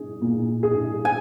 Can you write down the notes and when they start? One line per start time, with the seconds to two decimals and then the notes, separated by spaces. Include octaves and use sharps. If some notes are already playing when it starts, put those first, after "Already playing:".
Already playing: G#4
0.22 A#2
0.63 G#4
1.05 G#5